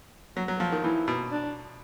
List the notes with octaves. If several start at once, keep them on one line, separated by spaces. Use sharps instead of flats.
F#3 F#4
F#3
F3
D#3
E3 E4
B2
D4